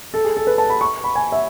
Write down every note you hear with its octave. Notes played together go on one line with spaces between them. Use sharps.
A4
G#4
A4
B4
A5
B5
C#6
B5
G#5
E5